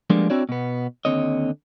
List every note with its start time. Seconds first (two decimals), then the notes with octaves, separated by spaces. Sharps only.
0.10 F3 G3 G#3 A#3 B3 D4
0.30 C4 D4 E4 F#4 C#5 D5
0.49 B2 B3
1.05 D#2 D3 C4 C#5 D#5